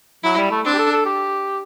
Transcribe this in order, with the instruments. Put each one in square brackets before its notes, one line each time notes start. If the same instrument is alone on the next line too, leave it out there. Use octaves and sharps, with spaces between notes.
[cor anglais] F#3 [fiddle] E4
[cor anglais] G3
A3
[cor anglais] C4 [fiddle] D4
[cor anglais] G4
A4
A4
G4